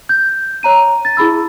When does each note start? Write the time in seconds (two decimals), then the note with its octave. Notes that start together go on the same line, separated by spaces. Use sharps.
0.09 G6
0.63 C#5 A#5 D#7
1.05 A6
1.17 E4 G#4 B5 E6